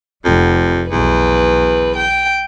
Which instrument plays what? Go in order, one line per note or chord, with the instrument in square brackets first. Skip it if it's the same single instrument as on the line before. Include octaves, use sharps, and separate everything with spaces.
[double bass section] F1 [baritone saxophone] F2
[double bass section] B1 [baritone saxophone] E2 [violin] B4
[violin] G5